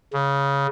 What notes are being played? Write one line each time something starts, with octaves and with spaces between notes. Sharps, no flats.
C#3